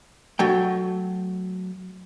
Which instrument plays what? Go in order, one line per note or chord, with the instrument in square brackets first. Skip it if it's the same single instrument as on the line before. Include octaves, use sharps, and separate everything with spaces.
[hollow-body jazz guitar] F#3 A3 G5